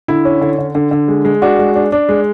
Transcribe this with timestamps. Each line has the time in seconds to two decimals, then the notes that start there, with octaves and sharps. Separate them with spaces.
0.08 D3 E4
0.25 C#4
0.41 D3
0.59 D3
0.75 D3
0.91 D3
1.08 G#3
1.25 G#3
1.42 D4 F#4
1.59 G#3
1.75 D4
1.92 D4
2.09 G#3